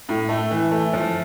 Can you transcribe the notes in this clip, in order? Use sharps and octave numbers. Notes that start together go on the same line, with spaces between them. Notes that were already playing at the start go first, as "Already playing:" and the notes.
A2
A3
E3
A3
F3